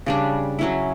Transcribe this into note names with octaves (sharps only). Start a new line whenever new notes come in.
C#3 G3 D4
F#3 C#4 E4